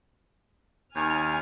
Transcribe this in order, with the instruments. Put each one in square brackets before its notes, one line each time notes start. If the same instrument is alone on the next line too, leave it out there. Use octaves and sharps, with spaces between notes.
[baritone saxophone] D#2 [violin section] G#5 F6